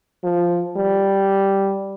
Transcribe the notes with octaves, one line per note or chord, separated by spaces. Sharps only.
F3
G3